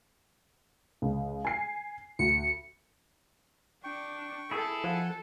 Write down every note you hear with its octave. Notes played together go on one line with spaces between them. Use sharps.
C#2
G#5 C7
D2 C#7
D4 G5 C#6
E4 G#4 A4 E5
F3 F#5 G#5